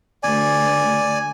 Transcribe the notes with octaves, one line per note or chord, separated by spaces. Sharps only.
D2 D5 G#5